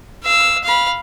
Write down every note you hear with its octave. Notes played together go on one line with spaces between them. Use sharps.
F5 E6
F5 B5